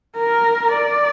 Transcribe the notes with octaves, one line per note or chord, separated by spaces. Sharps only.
A#4
D5